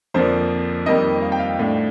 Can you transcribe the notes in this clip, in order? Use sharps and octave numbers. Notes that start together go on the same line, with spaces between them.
F2 D3 F3 A#3 D4 C5
F2 D#3 G3 A#3 D#4 D#5
F5
G5
F5
A2 A3 D4